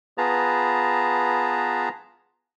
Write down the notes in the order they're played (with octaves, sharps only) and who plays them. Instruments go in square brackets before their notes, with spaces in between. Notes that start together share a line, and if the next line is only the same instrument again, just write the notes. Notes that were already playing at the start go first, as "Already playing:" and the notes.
[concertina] B3 F4 G#4 B4 A5 A#5